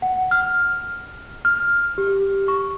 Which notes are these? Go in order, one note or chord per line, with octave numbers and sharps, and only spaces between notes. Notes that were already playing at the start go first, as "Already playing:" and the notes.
F#5
F6
F6
G4
C#6